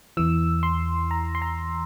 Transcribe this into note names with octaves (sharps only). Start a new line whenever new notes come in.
E2 E3 E6
C6
A#5
C6
A#5